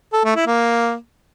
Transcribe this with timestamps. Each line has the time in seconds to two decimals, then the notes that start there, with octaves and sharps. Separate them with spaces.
0.13 A4
0.24 A3
0.36 E4
0.47 A#3